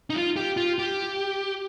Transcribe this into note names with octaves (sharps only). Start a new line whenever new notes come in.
D#4
F4
G4
F4
G4